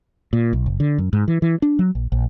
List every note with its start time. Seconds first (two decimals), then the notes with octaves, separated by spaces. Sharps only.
0.33 A#2
0.53 B1
0.66 F#1
0.80 D3
0.98 F#2
1.13 G#2
1.28 E3
1.42 E3
1.62 D4
1.79 F#3
1.95 A#1
2.12 A#1